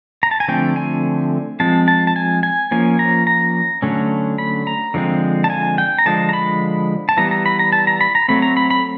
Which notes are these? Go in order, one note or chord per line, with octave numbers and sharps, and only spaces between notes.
A#5
A5
G#5
D3 F3 A3 C4 G5
G#5
F3 G#3 C4 A5
A5
A5
G#5
G#5
F3 A#3 C#4 G#5
A#5
A#5
D3 F#3 A3 C#4
B5
A#5
D3 F3 G#3 C4
A5
G#5
G5
A#5
D3 F3 G#3 A5
A#5
B5
A5
E3 G3 B3 A#5
A#5
B5
A#5
A5
A#5
B5
A#5
F#3 A3 C4 B5
A#5
B5
B5